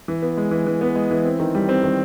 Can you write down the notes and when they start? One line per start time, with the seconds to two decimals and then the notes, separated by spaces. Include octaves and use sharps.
0.08 E3
0.22 B3
0.37 G#3
0.51 E3
0.67 E3
0.81 B3
0.96 G#3
1.11 E3
1.25 C4
1.40 D#3
1.55 G3
1.69 C4
1.84 D#3